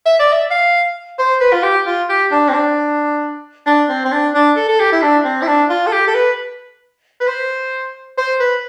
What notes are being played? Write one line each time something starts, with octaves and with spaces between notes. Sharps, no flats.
E5
D5
E5
F5
C5
B4
F4
G4
F4
G4
D4
C4
D4
D4
C4
C4
D4
D4
A4
A4
G4
E4
D4
C4
E4
D4
F4
A4
G4
A4
B4
B4
C5
C5
B4